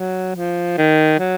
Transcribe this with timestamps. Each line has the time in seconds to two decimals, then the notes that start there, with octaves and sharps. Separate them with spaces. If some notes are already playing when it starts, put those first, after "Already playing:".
Already playing: F#3
0.36 F3
0.78 D#3
1.19 F#3